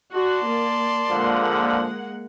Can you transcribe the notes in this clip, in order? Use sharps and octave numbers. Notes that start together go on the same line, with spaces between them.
F#4 D5 A5 C6
A#3
A#2 D3 F3 G#3 A#3 F#5